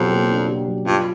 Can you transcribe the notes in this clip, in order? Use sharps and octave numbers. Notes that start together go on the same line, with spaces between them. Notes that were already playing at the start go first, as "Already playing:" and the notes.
Already playing: F2 B2 F#3 G4
A#3
D4
G4
F#3
G2 F4